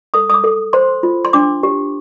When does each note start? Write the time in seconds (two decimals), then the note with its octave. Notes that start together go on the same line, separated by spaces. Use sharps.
0.14 A4 D#6
0.30 D#6
0.34 D6
0.44 A4
0.73 C5 C6
1.03 F4
1.25 C6
1.33 D4 D6
1.63 G4